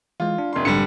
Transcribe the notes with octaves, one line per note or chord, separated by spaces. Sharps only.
E3 G#3 F4
D4
F1 C6
A#1 G#2 D3 G3 C#7